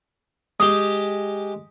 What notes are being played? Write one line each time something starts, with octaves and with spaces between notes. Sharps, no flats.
G#3 G4 D#6